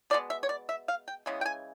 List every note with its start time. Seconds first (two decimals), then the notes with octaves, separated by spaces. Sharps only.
0.10 B2 G#3 B3 D5
0.30 E5
0.43 C#5
0.49 D5
0.69 E5
0.88 F5
1.08 G5
1.26 C#3 E3 G#3 B3
1.41 G5
1.46 G#5